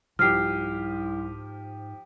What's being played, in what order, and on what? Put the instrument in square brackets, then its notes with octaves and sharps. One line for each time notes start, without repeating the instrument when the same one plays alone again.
[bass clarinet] C2 [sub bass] G#2 [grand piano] F3 G4 [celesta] F6 C7